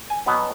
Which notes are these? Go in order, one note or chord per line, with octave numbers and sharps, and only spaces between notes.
G#5
B2 F#3 B3